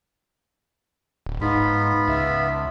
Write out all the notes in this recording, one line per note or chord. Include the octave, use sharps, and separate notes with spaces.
D1
G#2 B3 D#4 F4 B5
C#2 E5